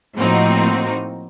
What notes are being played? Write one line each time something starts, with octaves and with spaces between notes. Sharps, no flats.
A2 F3 A#3 C4 D#4 F#4